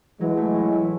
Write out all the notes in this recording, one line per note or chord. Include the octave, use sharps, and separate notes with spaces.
E3 F#3 G#3
A3
A2
E4